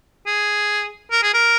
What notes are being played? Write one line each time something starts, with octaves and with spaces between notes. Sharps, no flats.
G#4
A#4
G#4
A#4